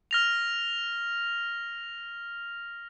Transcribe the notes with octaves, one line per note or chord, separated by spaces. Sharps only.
F6 A#6 F7